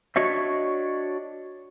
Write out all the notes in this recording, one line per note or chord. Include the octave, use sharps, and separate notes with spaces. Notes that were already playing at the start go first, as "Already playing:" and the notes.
D4 F#4 C#5 D#5 E5